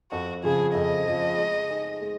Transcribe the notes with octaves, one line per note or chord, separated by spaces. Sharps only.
F2 F#4
C#3 F3 G#4
F2 D#5
C#3 F3
G#3
D#4 G#4
G#3